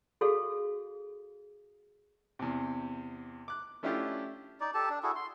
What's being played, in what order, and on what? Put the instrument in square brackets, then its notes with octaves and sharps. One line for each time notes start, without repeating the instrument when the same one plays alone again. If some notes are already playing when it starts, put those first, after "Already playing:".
[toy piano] F#4 G#4 A4 F5
[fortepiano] E2 C3
D6 F#6
A3 C#4 D4 E4 F4 G4
[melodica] D#4 D5
G4 A4 A5
D4
E4 F#4 G#4 A4
C6